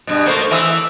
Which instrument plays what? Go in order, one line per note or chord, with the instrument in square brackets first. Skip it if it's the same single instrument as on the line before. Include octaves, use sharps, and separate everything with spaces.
[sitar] G2 B2
[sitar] A3 A#3 [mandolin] F#4 C5
[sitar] E3 [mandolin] E5 D#6 E6
[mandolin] D6